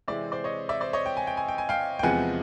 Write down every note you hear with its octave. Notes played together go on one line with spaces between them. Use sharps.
C3 E3 G#3 C4 D5 E5
C5 D5
C#5 D#5
D5 E5
C5 D5
C#5 D#5
G5
G#5
G5
G#5
G5
G#5
F5 G5
G5
E2 C3 F3 G#3 B3 F#5 G#5